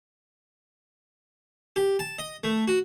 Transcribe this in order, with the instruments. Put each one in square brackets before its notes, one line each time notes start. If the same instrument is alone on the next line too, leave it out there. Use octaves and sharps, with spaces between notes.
[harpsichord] G4
A5
D#5
A3
F#4